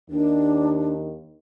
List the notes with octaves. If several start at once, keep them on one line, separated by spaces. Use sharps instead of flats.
D#2 D#3 D4